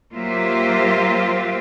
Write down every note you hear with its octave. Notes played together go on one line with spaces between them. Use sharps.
F#3 A#3 F4 G4 C5 E5